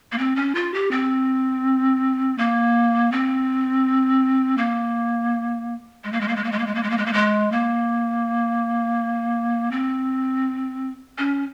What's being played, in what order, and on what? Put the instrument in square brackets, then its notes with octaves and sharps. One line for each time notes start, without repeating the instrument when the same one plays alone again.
[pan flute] A#3
C4
C#4
F4
G4
C4
A#3
C4
A#3
G#3
A#3
G#3
A#3
G#3
A#3
G#3
A#3
G#3
A#3
G#3
A#3
G#3
A#3
G#3
A#3
C4
C#4